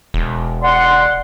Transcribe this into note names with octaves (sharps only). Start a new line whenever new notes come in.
E1
D5 F#5 C6